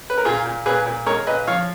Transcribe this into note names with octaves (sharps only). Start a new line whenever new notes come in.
B4
A#4
A#2 F4 G#4
A#2
A#2 G#4 B4
A#2
G#3 A#4 C#5
A#2 B4 D#5
F3 C#5 F5